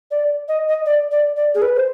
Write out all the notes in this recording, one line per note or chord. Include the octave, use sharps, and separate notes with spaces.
D5
D#5
D#5
D5
D5
D5
G#4
B4
C5